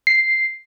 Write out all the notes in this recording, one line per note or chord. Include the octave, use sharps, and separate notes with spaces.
C7